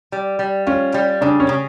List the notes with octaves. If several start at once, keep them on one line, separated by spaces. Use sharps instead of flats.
G3
G3
C#4 F4
G3
C#3 D4
C#4
C#3